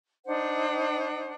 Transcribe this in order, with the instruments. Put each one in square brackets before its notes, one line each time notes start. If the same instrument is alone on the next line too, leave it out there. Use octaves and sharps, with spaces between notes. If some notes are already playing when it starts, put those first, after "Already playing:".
[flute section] D4 D#4 C5 F#5